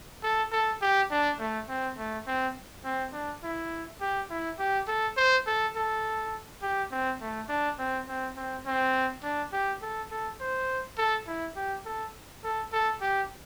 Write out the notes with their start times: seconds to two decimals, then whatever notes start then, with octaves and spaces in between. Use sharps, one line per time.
0.23 A4
0.52 A4
0.81 G4
1.11 D4
1.39 A3
1.69 C4
1.98 A3
2.27 C4
2.84 C4
3.13 D4
3.43 E4
4.01 G4
4.30 E4
4.59 G4
4.87 A4
5.17 C5
5.46 A4
5.76 A4
6.62 G4
6.91 C4
7.21 A3
7.49 D4
7.79 C4
8.08 C4
8.36 C4
8.66 C4
9.23 D4
9.53 G4
9.82 A4
10.11 A4
10.40 C5
10.98 A4
11.27 E4
11.56 G4
11.85 A4
12.43 A4
12.72 A4
13.01 G4